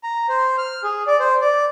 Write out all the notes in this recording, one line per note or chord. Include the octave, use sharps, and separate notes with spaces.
A#5
C5
F6
G#4
D5
C5
D5